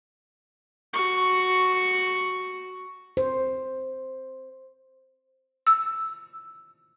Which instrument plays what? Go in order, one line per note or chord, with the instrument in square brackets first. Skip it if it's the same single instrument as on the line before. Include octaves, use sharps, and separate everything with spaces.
[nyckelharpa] F#4 C#6
[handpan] C5
[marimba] E6